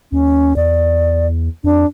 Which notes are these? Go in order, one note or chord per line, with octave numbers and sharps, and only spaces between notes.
D#2 C#4
E2 D5
F2 D4